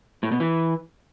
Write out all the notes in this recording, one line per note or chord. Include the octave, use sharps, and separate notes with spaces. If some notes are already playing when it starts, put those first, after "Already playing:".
A2
B2
E3